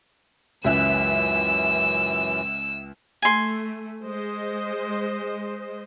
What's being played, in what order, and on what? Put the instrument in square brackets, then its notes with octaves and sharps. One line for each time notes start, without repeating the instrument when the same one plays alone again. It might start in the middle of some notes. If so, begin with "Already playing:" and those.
[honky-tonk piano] C#2 E5 F#6 [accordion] F#2 E3 [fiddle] E6
[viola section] A3 [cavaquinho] G#5 C6
[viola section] G#3 C5 D#5